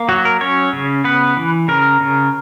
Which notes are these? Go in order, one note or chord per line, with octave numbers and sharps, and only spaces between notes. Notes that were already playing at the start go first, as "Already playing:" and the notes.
Already playing: A#3
F#3 F#4
A#4
C#4 C#5
C#3
B3 B4
E3
C#3 A#4
C#3